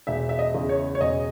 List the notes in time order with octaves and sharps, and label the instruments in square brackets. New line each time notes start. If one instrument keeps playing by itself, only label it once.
[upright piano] E1 E5
E5
D#5
E2 C#3
C#5
C#5
E1 D#5